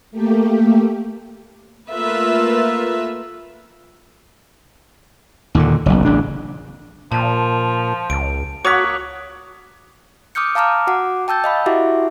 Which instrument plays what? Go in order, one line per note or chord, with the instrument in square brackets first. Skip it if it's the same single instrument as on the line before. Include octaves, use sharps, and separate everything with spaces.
[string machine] A3 A#3 G4
[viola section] A3 A#3 F4 B4 E5
[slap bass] D#2 A#2 D3
F#1 B1
A1 C#3 D4
[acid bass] A#2 [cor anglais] F3 [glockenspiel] A5
[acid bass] C#2 [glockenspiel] D7
[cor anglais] A#3 [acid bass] F#4 [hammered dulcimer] C#5 F#5 [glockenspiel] D6 D#6 B6
[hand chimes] D6 D#6 F6 G6 C#7
F5 A5 A#5 D6 F6
F#4 F#5 D6
G5 A5 E6 G6 A6
D#5 F5 B5
E4 F#4 G4 E5 F#5 D6